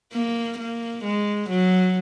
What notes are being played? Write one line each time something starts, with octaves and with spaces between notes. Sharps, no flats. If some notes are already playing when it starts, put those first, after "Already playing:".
A#3
A#3
G#3
F#3